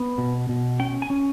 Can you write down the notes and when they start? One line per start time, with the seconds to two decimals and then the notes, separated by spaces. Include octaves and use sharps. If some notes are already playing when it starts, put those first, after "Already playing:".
Already playing: B3
0.18 B2
0.49 B2
0.80 C#4 G5
1.02 G#5
1.10 C#4